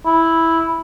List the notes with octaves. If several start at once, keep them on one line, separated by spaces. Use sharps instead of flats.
E4